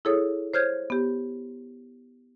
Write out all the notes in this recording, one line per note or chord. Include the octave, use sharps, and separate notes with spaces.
E4 G#4 A4 C#5 D#6
C5 C#5 F6 G6 G#6
B3 G4